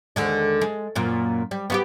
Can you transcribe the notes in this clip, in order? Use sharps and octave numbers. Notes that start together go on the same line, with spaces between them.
D#2 D3 G#3
G#3
F#2 A#2 A#3
G3
B3 F#4 G4